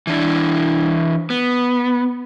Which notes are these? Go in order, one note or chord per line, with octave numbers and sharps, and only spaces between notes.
E3 D4 E4
B3